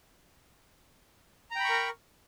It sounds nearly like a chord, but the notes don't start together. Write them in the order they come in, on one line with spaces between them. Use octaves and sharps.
A#5 G5 B5 C#6 A#4